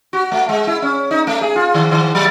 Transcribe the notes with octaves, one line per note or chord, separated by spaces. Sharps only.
F#4
A3
G#3
E4
C#4
D#4
A3
G#4
F4
D#3
D#3
F#3